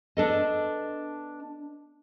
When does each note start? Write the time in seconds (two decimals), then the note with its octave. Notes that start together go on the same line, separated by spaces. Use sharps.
0.17 B3 D4 A4 D#5